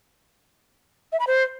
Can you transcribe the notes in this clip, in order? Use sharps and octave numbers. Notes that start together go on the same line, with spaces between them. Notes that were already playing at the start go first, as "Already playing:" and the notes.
E5
B5
C5